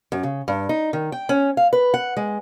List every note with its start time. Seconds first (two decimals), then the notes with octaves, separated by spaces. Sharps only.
0.12 F#2
0.23 C#3
0.48 G2
0.69 D#4
0.93 D#3
1.12 G5
1.29 C#4
1.57 F5
1.73 B4
1.94 F#5
2.17 G#3